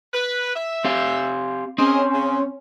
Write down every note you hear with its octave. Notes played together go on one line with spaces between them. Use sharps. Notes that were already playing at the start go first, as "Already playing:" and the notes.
B4
E5
C4 G4 F5
C4 C#4 G#4 A#4 D#5
C#3